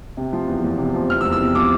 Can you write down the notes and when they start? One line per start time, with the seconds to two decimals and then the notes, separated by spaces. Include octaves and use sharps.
0.17 C3
0.33 F3
0.47 E2
0.64 E2
0.78 C3
0.94 F3
1.09 E2 F6
1.21 E6
1.25 E2
1.32 E6
1.40 C3
1.55 F3 D6